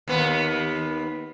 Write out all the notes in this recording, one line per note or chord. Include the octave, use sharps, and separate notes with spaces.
D#2 B3